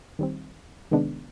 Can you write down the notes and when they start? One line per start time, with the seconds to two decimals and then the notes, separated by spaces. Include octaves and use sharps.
0.19 D#3 G3 C4
0.91 C3 D#3 G#3 B3 D4